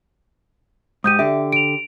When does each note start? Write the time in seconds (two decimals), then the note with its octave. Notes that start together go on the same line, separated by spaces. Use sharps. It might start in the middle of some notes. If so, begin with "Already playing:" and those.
1.04 G#2 G4 D#6 G6 D#7
1.19 D3 G4 E5
1.53 D7 F7